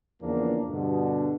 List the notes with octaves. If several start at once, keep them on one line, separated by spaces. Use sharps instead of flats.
E2 C#3 E3 F3 A#3 D4
G2 B2 D3